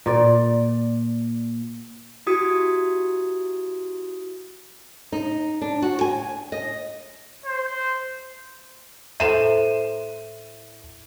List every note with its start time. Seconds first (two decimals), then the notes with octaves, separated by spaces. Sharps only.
0.06 A#2 D5
2.27 E4 F#4 G4 D#6 G#6
5.12 D#4
5.62 D4
5.82 F#4
6.01 G#5
6.52 D#5
7.46 C5
9.20 A2 C5 E5 D#7 E7